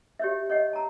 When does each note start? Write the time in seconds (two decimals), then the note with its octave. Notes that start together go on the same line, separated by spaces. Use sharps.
0.19 G4 C#5 E5
0.50 C#5 D#5 F#5
0.73 A5 A#5